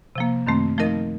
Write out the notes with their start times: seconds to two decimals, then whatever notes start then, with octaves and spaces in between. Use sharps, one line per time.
0.16 C3 F3 A#3
0.47 F#2 D#3 A3 C4
0.78 F3 A3 D#4 A#4 D#5